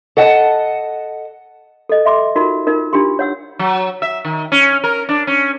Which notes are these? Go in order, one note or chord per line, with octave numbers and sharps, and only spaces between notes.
A4 D#5 F#5 A5
A4 D#5
E5 C6 D6
D#4 F4 F#4 A#4 C6
D#4 F4 A#4
D4 F4 G4 C6
C#5 F#5 E6
F#3
E5
D#3
C#4
A#4
D4
C#4